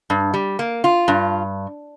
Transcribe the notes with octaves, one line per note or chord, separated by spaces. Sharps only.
G2
G3
A#3
F4
G2